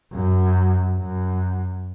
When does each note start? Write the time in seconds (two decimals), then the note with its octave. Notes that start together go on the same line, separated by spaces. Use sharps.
0.13 F#2
0.97 F#2